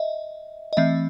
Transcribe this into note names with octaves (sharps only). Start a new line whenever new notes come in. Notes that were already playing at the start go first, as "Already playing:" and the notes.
Already playing: D#5 E5
D#5
E3 A3 C4 E5